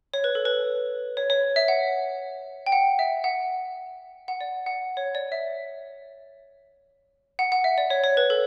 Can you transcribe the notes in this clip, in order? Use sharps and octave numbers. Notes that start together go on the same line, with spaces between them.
C#5
B4
A4
B4
C#5
C#5
E5
F#5
G5
F#5
E5
F#5
F#5
D5
F#5
C#5
D5
E5
F#5
F#5
E5
D5
C#5
C#5
B4
A4